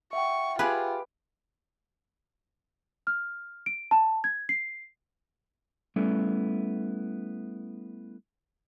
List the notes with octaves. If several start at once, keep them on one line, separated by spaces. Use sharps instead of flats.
E5 F#5 G5 C#6
F4 G4 G#4 B4 C#5
F6
D7
A5
G#6
C7
G3 A3 B3 C#4 E4 A4